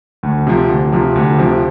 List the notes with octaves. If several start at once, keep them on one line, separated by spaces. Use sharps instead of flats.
D2
C3 F3
D2
C3 F3
D2
C3 F3